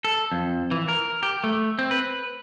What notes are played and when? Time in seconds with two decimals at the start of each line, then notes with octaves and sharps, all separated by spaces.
0.05 A4
0.32 F2
0.71 E3
0.89 A#4
1.23 G4
1.44 A3
1.79 C4
1.91 B4